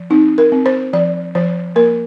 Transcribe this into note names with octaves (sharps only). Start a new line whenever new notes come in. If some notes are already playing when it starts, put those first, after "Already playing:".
Already playing: F3
C4 D#4
A#4
C4
C5
F3 D5
F3 C5
A#3 A#4